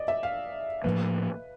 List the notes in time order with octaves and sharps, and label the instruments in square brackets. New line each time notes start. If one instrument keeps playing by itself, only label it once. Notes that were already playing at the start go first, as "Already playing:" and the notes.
Already playing: [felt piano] D5 D#5
E5
F5
[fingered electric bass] A2 F3 A#3 [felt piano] B4